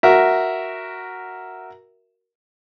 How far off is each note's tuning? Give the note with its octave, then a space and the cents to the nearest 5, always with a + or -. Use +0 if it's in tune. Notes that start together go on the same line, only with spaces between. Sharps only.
F#4 +0 A#4 +0 E5 +0